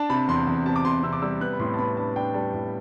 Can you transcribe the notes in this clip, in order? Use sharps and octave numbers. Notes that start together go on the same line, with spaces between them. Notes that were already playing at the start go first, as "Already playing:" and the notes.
Already playing: D4 A5
C3 B5
E2 C6
E2
C3 A5
D6
C3 C6
C3 E6
D6
G3 E6
B3 F#6
B5
A2 C6
A5
B3 B5
D4 A5
D4 G5
G3 A5
A2